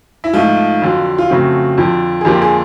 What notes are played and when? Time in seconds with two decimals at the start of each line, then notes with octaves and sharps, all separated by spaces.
0.24 E4
0.33 G#2 F3 A3 F4
0.82 F2 D3 F#3
1.18 F4
1.30 F2 C#3 F#3 A3 C4 F#4
1.78 F2 D3 F3
2.21 G#4
2.25 F2 D3 F3 A#3 G4
2.42 G#4